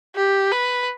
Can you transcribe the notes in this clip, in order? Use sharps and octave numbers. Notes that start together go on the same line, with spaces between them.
G4
B4